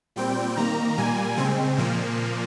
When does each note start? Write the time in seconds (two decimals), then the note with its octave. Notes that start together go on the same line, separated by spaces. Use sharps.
0.16 A#2 G3 C4 G5
0.57 D#3 A#3 A#5
0.98 A#2 G3 A#3 G#5
1.37 C#3 G#3 C4
1.78 A#2 F3 A#3